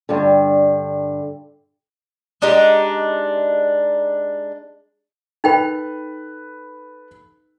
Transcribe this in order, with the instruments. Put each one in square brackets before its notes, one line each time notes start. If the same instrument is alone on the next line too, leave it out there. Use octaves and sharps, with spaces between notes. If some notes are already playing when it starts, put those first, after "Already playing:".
[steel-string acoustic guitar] G2 D3
[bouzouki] G#3 D4 D#4 G4
[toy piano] D#4 G5 B5 [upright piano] A4 B4